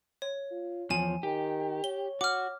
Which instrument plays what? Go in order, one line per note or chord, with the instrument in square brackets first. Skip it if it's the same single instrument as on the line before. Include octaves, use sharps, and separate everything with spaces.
[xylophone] C#5
[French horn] F4
[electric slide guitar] E2 F3 [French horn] C#5 [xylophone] G#5 E7
[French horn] D#3 [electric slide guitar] G4
[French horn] C#5 [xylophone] G7
[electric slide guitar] F#4 [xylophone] D6 F6